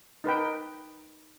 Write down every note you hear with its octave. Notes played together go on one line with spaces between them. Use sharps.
D#4 A#4 B4 G5